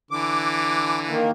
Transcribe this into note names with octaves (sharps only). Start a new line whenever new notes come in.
D3 E3 D6
D#3 A#3